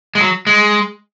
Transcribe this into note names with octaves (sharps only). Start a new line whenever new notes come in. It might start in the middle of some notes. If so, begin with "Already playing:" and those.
G#3
F#3
G#3